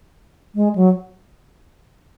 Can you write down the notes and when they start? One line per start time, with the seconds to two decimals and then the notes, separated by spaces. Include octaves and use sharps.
0.55 G#3
0.75 F#3